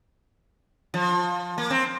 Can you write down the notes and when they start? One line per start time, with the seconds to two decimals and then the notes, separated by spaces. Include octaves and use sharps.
0.94 F3
1.58 A#3
1.70 C4